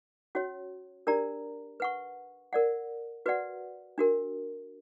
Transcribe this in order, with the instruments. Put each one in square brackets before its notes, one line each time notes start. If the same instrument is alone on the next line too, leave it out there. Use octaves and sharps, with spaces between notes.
[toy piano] C#4 F#4 C#5
D4 G4 A#4 D5 A#5
B4 F#5 C#6
A#4 D5 F#5
F#4 B4 D5 F#5
D4 F#4 A#4